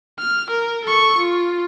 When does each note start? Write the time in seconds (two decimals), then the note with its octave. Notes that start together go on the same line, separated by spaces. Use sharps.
0.19 F6
0.50 A#4
0.85 A4 C#6
1.18 F4